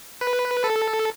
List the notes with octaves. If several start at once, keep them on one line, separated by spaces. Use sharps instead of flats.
B4
A4